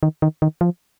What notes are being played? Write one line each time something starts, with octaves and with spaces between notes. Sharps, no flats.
D#3
D#3
D#3
F3